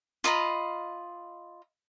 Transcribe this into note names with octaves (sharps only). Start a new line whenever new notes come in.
F4 D#5 A#5 B5